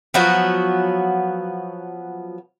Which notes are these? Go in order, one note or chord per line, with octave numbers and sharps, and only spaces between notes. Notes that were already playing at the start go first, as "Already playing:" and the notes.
F3 F#3 B3 F#4